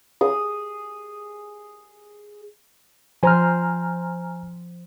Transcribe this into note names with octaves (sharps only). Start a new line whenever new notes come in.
G#4 D#6
F3 C5 G#5 A#5 F6